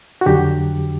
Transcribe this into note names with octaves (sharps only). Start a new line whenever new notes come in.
F#4
F2 D3 F#3 G4